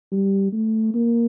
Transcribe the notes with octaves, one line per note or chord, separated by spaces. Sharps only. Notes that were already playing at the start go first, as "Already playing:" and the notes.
G3
A3
A#3